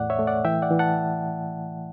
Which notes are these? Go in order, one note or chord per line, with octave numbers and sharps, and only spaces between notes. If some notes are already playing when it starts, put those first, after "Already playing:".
Already playing: E2 A2 D5 F#5
C#5 E5
A3
D5 F#5
E3 E5 G5
D5 F#5
E3
F#5 A5